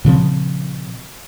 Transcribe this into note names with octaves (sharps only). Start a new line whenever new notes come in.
A#2 C#3 F3 C4